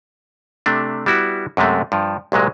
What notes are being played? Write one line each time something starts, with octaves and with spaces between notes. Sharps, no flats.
C3 A3 D4
G3 B3 E4 F#4
F#2 C3 G#3 A3
G2 F3
C2 A#2 F#3 G#3